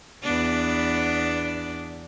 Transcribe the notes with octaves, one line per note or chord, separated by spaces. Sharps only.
E2 B3 D4